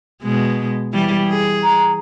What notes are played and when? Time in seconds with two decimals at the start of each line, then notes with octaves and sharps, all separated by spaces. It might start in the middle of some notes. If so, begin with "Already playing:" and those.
0.23 B2 G#3
0.93 E3 G3
1.28 G#4
1.64 A#5